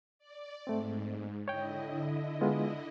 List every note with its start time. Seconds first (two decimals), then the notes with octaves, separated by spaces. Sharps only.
0.19 D5
0.67 G#2 A3 C4
1.48 D3 E4 C#5 D#5 G5
2.41 G#3 B3 F4